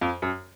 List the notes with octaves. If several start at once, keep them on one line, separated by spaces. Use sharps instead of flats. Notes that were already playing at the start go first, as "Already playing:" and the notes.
F2
F#2